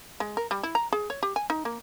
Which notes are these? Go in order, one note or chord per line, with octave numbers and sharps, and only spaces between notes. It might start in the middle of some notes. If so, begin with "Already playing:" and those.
G#3
A#4
G3
E4
A#5
G#4
C#5
G4
G#5
D#4
A#3